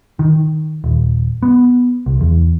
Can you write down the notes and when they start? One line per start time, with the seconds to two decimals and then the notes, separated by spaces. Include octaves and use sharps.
0.19 D#3
0.84 D#1
1.43 B3
2.06 C2
2.21 E2